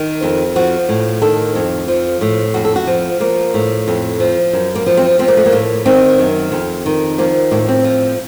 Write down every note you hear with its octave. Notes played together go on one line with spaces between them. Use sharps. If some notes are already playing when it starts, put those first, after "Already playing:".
Already playing: D#3
F2
F3 F#4
A2
D#3 A4
F2
F3
A2
F2 F#4
A4
F#4
F3
F3 A#3
A2
F2
F3
F#2
A#3
F3
C4
F3 C4
A#3
A3
A#3
A2
D#3 C4
F#2
F2
D#3
F3 A#3
A2 A#3
C4
F3